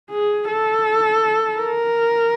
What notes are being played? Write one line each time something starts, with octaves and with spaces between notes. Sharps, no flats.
G#4
A4
A#4